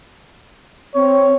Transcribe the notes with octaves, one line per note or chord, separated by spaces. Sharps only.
C4 C#5